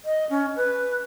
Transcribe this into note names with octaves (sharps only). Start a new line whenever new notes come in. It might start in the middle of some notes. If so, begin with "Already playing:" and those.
D#5
C#4
B4